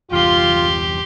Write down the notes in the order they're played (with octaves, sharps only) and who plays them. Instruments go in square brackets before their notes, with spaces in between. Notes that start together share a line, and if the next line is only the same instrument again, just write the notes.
[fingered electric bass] G1 E2 [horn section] F4 [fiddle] G4 C6